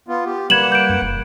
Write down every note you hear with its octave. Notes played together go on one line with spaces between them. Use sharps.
B3 F4
G4
G3 A#3 B4 F#5 G#6 E7 F#7
G6 D7
F#2
E1